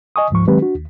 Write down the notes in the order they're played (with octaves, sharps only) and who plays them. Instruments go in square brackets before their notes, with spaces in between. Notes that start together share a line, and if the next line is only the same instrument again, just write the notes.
[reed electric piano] D#5 G#5 C#6 D#6
D2 G#2 F3 C#6
D#3 F#3 G#3 C4 G4 B4
D4 F#4
D#2